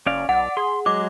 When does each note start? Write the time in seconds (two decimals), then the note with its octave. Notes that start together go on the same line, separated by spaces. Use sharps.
0.06 F#1 C#4 D5 F5
0.29 B1 D5 F#5
0.57 G#4 C6
0.86 F#3 G#3 D6